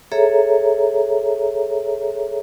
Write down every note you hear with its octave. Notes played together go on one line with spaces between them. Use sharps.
G#4 A4 C#5 E5 A#5